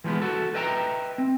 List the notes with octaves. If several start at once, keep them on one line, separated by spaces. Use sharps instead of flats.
E3 F3 G#3 B3
F#4 A4
B4 D#5 E5 G5 A5 A#5
C4